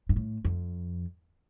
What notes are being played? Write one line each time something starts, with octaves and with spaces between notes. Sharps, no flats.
G2
A2
F2